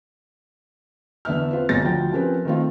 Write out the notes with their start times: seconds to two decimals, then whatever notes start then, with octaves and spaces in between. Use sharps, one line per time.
1.25 E2 D3 B3 E5 F6
1.51 C4 F4 B4
1.69 G1 A#2 G#3 A6 A#6
1.83 D2 D3 F3 G5
2.12 F3 C4 C#4 G4 A#4 B4
2.45 D#3 A3 C4 F4